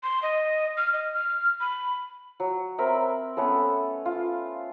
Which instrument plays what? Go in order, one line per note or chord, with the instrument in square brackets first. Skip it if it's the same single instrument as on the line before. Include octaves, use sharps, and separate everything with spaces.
[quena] C6
D#5
F6
D#5
F6
B5
[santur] F#3
C4 A#4 E5 B5
A3 B3 C#4 A4
F4